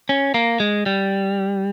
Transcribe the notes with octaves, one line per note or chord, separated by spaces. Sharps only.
C#4
A#3
G#3
G3